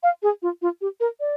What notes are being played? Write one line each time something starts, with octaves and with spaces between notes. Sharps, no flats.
F5
G#4
F4
F4
G4
A#4
D5